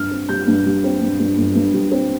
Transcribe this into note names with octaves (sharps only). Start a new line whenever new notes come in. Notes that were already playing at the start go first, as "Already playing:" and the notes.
Already playing: G2 F6
C4
G3 G6
G2
G3
C4
G2
G2
G1
G2
G3
C4